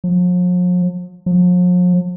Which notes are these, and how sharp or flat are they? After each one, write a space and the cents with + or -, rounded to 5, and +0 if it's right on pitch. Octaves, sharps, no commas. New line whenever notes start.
F3 +45
F3 +45